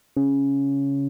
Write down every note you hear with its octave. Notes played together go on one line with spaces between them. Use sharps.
C#3